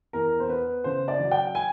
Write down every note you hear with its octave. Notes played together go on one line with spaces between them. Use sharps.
E2 A#4
C5
B3 B4
C#3 C5
D5
F#3
G5
G#5